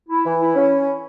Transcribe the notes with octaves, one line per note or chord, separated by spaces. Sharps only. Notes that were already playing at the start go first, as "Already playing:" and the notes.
E4
E3
E4
C#4